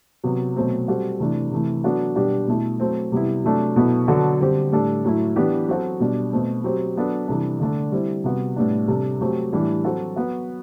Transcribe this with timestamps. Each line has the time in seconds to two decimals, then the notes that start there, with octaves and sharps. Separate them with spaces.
0.24 C3 F#3 B3
0.56 B2 F#3 A3 C4
0.88 G3 C4 F#4 A4
1.20 C3 E3 A3 D4
1.52 C3 E3 A3
1.84 F#3 B3 D4 F#4 A4
2.15 B2 G3 B3 D4 G4
2.48 B2 A3 E4 A4
2.80 F#3 A3 C4
3.12 C3 G3 B3 E4
3.44 C3 F#3 A3 D4 A4
3.76 B2 F#3 B3 E4 A4
4.07 D3 F#3 B3 F#4 A4
4.40 D3 G3 C4 G4
4.72 A2 G3 D4 A4
5.04 A2 F#3 A3 E4
5.36 E3 B3 D4 G4
5.68 F#3 C4 F#4 A4
6.00 B2 G3 D4
6.32 B2 A3 C4
6.64 F#3 C4 G4
6.96 F#3 B3 D4 A4
7.28 C3 E3 G3 D4 A4
7.60 D3 A3 D4 A4
7.92 G3 C4 E4
8.24 C3 G3 B3 F#4
8.56 A2 G3 B3 D4
8.88 C3 G3 D4 A4
9.21 F#3 A3 C4 G4
9.52 A2 E3 G3 D4 G4
9.84 F#3 C4 F#4 A4
10.16 F#3 B3 F#4